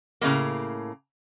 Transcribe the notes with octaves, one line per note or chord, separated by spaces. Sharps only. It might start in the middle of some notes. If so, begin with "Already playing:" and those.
A2 C#3 E3 G#3 A#3